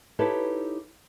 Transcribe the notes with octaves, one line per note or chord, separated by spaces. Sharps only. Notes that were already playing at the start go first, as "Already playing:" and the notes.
D#4 E4 G4 A4 B4 C#5